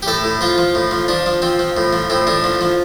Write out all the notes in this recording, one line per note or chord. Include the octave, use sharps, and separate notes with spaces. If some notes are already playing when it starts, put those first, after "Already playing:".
G4
A2 A4
A2
F3 F4
F3
A2
F3
F3 D4
F3
F3 C4
F3
A2
F3
A2 C4
A2 D4
F3
F3